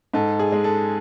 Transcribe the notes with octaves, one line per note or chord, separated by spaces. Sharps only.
G#2 A4
G#4
G#3
A4